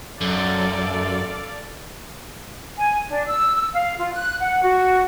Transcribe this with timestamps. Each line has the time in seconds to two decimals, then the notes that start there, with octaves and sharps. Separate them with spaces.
0.21 F#2 A4 D5 F5
2.78 G#5
3.09 D4
3.27 E6
3.73 F5
3.98 F4
4.13 F#6
4.41 F#5
4.63 F#4